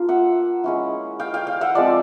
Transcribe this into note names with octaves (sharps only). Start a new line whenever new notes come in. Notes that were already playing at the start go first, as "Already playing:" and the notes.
Already playing: A#3 D4 F4
E5 F#5
G#3 C#4 E4
F5 G5
F5 G5
F5 G5
E5 F#5
F3 G#3 C4 D5 E5